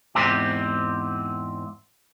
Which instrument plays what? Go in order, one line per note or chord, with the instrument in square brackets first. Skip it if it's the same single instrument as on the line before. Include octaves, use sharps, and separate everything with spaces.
[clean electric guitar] E2 G#2 C4 G4